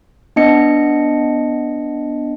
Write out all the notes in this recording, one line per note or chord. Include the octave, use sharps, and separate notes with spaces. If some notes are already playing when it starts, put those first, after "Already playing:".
B3 D4 D#5 C#7